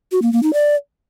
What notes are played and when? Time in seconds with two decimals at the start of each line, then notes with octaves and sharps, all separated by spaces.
0.12 F#4
0.22 A#3
0.33 A#3
0.43 D#4
0.53 D5